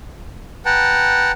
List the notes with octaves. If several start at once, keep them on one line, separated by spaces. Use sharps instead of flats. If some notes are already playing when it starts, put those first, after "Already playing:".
B4 F#5 G5 A5 A#5